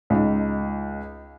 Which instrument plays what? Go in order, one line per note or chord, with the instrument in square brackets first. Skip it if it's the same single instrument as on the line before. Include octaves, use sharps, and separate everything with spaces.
[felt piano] C#2 D#4